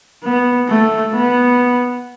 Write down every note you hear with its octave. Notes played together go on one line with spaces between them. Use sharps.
B3
A3
B3